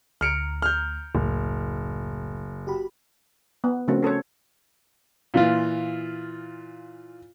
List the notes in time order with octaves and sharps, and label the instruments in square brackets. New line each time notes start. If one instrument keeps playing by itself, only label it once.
[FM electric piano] D2 A#5 [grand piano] F6 C#7 D7
[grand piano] F6 G6
[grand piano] F#1 [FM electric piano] C#2 A2
[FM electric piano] F#4 G4 B5
[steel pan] B3
C#3 F3 A3 C4 F#4 A#4
C#4 A4 C5 C#5
[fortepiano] A#2 E3 F4